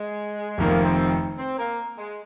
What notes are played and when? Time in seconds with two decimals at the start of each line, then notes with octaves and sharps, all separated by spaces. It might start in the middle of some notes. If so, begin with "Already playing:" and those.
Already playing: G#3
0.58 F1 F2 D#3 A#3
0.84 C4
1.38 C4
1.58 A#3
1.98 G#3